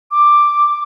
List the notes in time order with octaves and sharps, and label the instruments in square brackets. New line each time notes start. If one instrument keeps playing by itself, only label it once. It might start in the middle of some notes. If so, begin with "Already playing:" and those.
[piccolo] D6